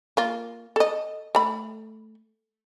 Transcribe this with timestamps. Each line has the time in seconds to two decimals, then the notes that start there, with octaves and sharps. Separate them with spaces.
0.17 A#3 F4
0.76 A4 D#5
1.35 A3 B5